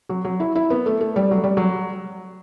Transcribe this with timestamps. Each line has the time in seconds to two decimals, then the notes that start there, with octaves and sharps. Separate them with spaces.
0.09 F#3
0.25 F#3
0.40 E4
0.55 E4
0.70 B3
0.86 A3
1.01 A3
1.16 G3
1.31 F#3
1.44 G3
1.57 F#3